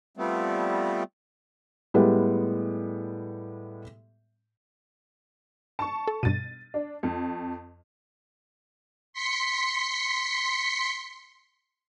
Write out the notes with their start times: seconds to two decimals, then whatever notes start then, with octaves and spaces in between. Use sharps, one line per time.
0.17 F3 G3 A3 B3 C4
1.94 A2 G3 G#3 B3
5.79 A5 C#6
6.07 A4
6.23 G2 B2 A6 D#7
6.74 D4
7.03 F2
9.13 C6 B6 C#7